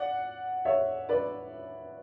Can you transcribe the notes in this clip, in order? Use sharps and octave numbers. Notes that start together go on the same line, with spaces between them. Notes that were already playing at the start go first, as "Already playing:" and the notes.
Already playing: D5 F#5
C#5 E5
B4 D5